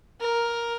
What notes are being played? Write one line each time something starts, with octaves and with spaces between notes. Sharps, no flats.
A#4